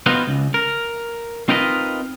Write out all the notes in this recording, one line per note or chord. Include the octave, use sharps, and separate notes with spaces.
B3 C4 D#4 F4 F#4 B4
C#2
A#4
C4 D#4 F4 A#4 B4 D#5